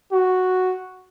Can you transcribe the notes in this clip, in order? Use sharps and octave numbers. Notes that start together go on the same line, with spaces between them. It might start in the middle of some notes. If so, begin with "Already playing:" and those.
F#4